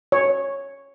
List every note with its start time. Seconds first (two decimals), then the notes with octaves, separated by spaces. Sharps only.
0.12 C#5